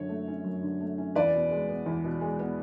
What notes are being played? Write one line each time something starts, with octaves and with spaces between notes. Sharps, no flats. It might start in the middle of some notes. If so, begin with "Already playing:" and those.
Already playing: F#2 D3 C#5
A3
C#4
F#2
D3
A3
C#4
E2 B4 D5
B2
G#3
B3
E2
B2
G#3
B3